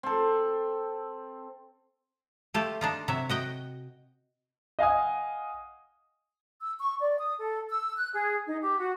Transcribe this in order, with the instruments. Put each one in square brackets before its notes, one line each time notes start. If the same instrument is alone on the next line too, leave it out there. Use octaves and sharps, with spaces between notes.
[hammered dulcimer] C4 A4
[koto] A3 F4 G4
D4 D#4 F4
C3 F#3 E5
F#4 D#5 G5
[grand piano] D#5 F5 F#5 G#5 D#6
[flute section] E6
C#6
D5
D#6
A4
E6
F#6
G#4
D#4
G4
F#4